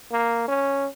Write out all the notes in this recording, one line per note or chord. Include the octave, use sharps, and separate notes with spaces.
A#3
C#4